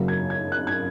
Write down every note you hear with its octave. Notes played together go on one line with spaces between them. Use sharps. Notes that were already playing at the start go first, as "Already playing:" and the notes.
Already playing: F#2 C#3 F#3 A#3
G#6
G#6
F#6
G#6